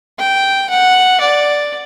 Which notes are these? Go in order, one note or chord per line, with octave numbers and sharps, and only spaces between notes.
G5
F#5
D5